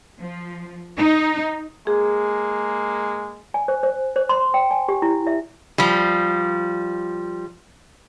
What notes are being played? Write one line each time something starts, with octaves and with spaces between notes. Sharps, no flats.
F3
D#4
G#3 A#3 G#4
G#5
C5
C5
C5
C6
G5
G#5
G4
E4
E5
F3 G3